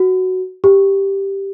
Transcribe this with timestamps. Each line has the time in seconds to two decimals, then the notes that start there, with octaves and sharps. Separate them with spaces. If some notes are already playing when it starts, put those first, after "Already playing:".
Already playing: F#4
0.64 G4